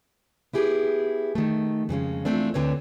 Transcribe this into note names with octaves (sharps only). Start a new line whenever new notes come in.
B3 E4 G4 G#4
D#3 A3
F2 C#3 G#3 C#4
E3 F3 A3 C4 D4
D2 D3 C4 B4 C#5